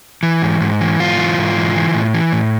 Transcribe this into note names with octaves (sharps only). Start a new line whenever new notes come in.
E3
G#2
G#2
E3
G#2 F4
E3
G#2
E3
E3
A2
E3
A2